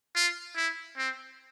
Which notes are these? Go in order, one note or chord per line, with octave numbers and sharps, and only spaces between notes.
F4
E4
C4